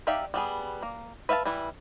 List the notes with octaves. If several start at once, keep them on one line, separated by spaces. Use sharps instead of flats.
D#4 G4 D5 E5 F5
G3 B3 G#4
A#3
B4 E5 F5 G#5 A5
E3 G3 E4 B4